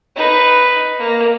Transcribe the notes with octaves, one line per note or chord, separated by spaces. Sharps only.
D#4 B4
A#3